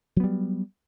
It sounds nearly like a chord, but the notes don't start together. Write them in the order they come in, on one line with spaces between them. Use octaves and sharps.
F#3 B3 G3